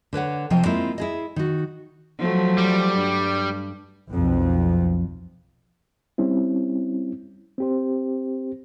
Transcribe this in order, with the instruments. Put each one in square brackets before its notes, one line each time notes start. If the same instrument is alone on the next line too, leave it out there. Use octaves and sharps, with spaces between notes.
[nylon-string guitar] D3 B4 C#5 F#5
C3 F3 D#5 G5
G#3 A#3 C4 E4 F4
E4 G#4 D#5
D#3 F#4
[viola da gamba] F3 F#3 A3
[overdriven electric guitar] G3
[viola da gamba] G2
[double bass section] B1 F2
[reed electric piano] G3 C4 C#4 E4
C4 G4 C5